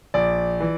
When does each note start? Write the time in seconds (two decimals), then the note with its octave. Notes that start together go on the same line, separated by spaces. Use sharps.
0.14 A#1 D5
0.60 E3